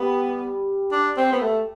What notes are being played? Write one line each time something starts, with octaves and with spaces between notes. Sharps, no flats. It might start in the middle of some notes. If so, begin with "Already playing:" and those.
Already playing: G3 B3
D4
C4
B3
A3